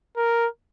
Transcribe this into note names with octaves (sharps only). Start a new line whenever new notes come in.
A#4